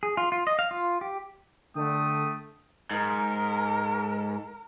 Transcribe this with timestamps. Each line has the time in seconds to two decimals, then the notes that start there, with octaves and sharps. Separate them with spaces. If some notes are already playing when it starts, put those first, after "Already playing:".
0.03 G#4
0.17 F4
0.32 F4
0.47 D#5
0.59 F5
0.71 F4
1.01 G4
1.75 D3 A3 G5 D#6
2.91 G#2 A#4